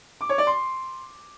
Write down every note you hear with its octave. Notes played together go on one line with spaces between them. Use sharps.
D6
C#5
D5
C6